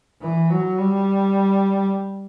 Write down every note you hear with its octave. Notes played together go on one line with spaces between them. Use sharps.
E3
F#3
G3